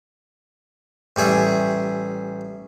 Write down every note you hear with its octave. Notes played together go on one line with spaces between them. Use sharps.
A1 G3 G#4 E5